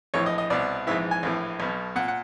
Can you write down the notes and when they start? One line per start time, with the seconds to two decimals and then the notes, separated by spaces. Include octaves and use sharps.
0.14 A#1 A2 E3 C#5
0.26 D#5
0.38 D#5
0.50 C2 B2 D5
0.87 A#1 G#2 E3 E5
1.11 G#5
1.23 A#1 A2 E3
1.60 B1 B2
1.96 A#2 F#5
2.08 F#5